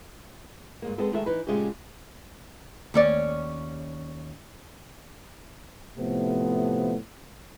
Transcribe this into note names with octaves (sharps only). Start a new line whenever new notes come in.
G2 G#3 A#3
G#3 B3 C4 A4
D#3 G#3 A3 A4 C#5 E5
E3 D#4 B4
A#2 C#3 G#3 A3 C#4 G4
D#2 C#4 D5
A2 C3 F3 A3 B3